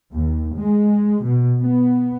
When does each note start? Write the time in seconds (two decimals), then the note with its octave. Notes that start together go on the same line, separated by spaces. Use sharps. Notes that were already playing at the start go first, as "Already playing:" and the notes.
0.13 D#2
0.57 G#3
1.23 B2
1.61 B3